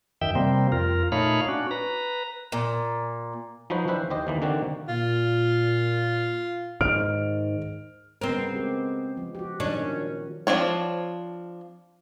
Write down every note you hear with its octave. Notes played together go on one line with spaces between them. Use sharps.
F#2 D#3 E5 G5
C3 G3 A#3 C4
F2 F4 A#4
A#2 A3 D#4 C#5 F5 B5
C#4 D4 F#4
B4 A#5
A#2
F3 F#3 D#4 F#4 B4 C5
C#4 D4 E4 G4 B4 C5
D#2 G4 C5 D#5
D#2 E3 A#3
D3 D#3 A#3 C4 F#4 G4
A#2 F4
G#2 D#3 F6 D7
C#3 B3 C4 A#4 C5
G#3 G4
F3
F#4 G4
A#2 D#3 F#3 C#4 D4
F3 C4 D4 C#5